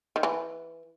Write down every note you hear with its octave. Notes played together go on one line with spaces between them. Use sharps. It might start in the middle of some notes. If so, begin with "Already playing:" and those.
D#3
E3